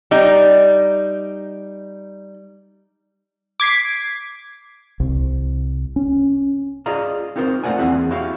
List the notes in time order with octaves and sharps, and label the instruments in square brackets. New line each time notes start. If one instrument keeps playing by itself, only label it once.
[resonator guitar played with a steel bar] G3 D#4
[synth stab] D6 G#6 B6 C7
[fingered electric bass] C2
C#4
[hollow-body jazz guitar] F4 G#4 D5 D#5 F5 A#5
C4 D#4 F4 A#4 C5
A3 A#3 F4 D5 F#5 G#5
E2 B2 C4 E4 G#4 F#5
E4 F#4 G4 C#5 F5